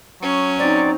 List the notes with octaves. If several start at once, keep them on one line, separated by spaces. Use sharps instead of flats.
F#3 C#4
C4 D#4 D5